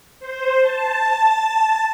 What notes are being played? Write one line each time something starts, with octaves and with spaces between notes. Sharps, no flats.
C5
A5